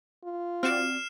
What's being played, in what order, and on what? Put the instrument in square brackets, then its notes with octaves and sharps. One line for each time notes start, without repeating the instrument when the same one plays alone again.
[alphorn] F4
[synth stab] C4 F#4 D5 [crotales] F6 C7 E7